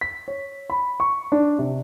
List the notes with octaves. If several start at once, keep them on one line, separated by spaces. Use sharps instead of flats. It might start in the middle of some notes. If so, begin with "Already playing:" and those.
B6
C#5
B5
C#6
D4
C3